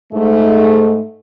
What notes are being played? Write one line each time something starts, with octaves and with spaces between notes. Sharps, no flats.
G#2 A3